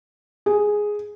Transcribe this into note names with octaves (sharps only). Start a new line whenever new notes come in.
G#4